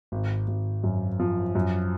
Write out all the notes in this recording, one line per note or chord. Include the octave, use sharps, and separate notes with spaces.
G#1
G#1
F#2
F3
F#2